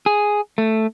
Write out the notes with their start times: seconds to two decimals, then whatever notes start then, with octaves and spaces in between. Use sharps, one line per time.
0.06 G#4
0.58 A3